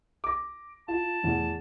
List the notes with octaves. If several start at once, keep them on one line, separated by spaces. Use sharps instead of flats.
D6 A#6
F4 A5
E2 A2